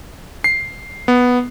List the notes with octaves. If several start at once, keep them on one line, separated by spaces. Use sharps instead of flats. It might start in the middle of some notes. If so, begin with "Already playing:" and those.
C7
B3